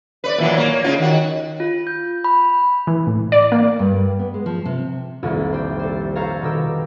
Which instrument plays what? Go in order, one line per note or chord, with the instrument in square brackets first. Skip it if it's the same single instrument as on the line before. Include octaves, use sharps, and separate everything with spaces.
[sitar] B4 C#5 D5
A#2 E3 F#3
A#3 C#5
C#3 C#4 F4
D#3 F#4
[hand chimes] F4
G6
B5
[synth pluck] E3
A2
D5
A#3
[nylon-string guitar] G2
B3
G#3
F3
C3
[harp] D#1 C2 F2
G4 C5
A4 C5
A4 C5 C#5 F5 A#5
B2 D#3 G4 E6